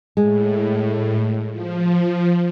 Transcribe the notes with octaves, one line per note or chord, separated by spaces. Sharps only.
A2 G#3
F3